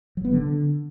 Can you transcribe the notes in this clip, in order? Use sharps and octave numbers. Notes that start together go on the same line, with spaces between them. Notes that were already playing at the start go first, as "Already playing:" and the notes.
F#3
B3
D3